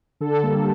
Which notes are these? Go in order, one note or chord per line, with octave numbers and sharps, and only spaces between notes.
D3 A4
G3 A#3